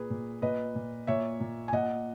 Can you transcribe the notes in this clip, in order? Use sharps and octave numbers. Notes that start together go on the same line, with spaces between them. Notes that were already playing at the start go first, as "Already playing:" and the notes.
Already playing: A#2 G#4 B4
A#2
A#2 B4 D#5
A#2
A#2 C#5 E5
A#2
G#5
A#2 D#5 F#5